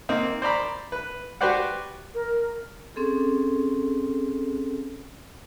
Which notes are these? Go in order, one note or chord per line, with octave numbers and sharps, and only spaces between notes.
A#3 C4 D#4
C5 D5 A#5 B5
B4
F#4 G4 B4 C5 D5 F#5
A#4
C4 C#4 G#4 A4